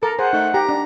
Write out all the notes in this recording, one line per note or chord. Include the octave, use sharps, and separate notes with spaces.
A4 A#4
G#4 C5 F#5
A3 D#4
G4 A#5
D4